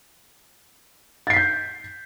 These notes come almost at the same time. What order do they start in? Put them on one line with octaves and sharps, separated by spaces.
A6 C7 B6 G6